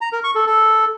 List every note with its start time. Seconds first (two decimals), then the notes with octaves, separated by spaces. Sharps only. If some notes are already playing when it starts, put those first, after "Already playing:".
0.01 A#5
0.12 A#4
0.24 C#6
0.35 A4
0.46 A4